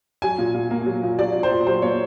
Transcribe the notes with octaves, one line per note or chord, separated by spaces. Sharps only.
F#3 G#5
A#2
A#2
A#3
F#3
A#2
F#3 D5
A#2
C5
A#2
F#3 C5
A#3 C#5